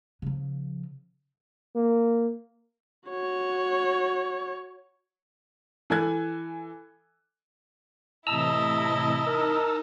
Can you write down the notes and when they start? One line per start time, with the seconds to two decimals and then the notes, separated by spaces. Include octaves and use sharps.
0.22 C#3 F3
1.76 A#3
3.09 F#4 C#5
5.90 E3 A4 G#5 F#6 G#6
8.27 A2 C3 E3 E4 D#5 A5 A#5 E6
9.26 D#4 A#4